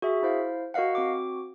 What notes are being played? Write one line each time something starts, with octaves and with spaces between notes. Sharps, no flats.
F#4 G#4 E5
E4 C5 F5
F#4 A#4 D#5 F5 F#5
C4 F#4 D6